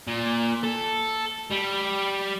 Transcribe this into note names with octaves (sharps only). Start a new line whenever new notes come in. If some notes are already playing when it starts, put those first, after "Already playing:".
A#2
A4
G3